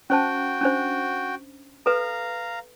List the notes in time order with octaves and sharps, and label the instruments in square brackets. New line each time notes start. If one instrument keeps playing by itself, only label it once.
[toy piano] C#4 C5 A5 [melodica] F#4 G5
[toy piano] C#4 D4 C5
[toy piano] A4 B4 [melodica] F5 A#5